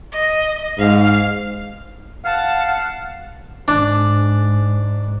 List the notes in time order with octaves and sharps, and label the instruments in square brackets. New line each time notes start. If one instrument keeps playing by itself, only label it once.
[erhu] D#5
[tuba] G#2 [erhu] F5
[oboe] F5 [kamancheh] F#5 A5
[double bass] G#2 [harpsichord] D4